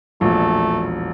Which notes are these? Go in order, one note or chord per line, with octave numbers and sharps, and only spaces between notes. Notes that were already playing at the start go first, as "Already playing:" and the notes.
E1 A#1 A3